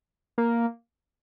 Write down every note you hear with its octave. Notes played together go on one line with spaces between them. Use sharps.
A#3